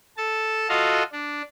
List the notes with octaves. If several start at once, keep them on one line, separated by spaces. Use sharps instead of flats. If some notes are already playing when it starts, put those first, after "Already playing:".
A4 A5
F4 F#4 A4 D#5 F5
D4